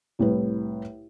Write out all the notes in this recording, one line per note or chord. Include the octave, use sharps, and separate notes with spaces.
C2 A2 B4